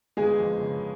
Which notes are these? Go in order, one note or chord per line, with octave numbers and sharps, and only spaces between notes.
G1 G#3 G#4
F2
C#3